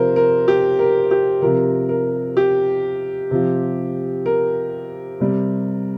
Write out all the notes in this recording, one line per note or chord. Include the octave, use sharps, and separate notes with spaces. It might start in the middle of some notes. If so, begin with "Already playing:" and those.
Already playing: C3 F3 A#4 C5
A#4
G4
A#4
G4
C3 F3 A#4
A#4
G4
C3 F3
A#4
C3 G3